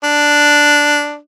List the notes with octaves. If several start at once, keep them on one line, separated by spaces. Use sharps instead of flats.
D4